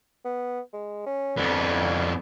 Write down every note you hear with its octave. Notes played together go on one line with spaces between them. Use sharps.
B3
G#3
C#4
F2 D3 B3